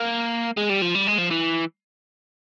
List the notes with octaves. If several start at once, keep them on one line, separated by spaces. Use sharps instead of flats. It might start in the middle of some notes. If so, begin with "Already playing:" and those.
Already playing: A#3
G#3
G3
F3
G3
G#3
F3
E3